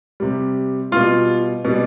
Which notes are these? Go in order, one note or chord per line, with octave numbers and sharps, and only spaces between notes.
C3 G3
B2 G3 F4
B2 G3